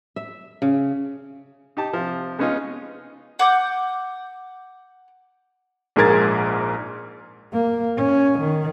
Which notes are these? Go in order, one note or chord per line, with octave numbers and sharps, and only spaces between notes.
E5
C#3
D#4 G4 A5
C3 F3
G#3 B3 C#4 D#4 F4 G#4
F#5 D6 G6
A#1 G#2 G#4 A#4 G#6 A6
A#3
C#4
D#3